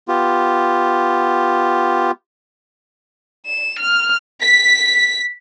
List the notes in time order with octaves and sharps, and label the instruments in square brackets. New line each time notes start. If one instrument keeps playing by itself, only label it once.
[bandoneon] B3 F4 G4
[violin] E7
F6
[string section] B6